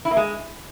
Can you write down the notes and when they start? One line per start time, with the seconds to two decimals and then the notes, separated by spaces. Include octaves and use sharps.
0.05 E4
0.11 A#3
0.17 G#3